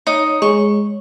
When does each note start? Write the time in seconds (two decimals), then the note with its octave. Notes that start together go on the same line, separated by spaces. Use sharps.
0.07 D#4 C#5
0.42 G#3 C#6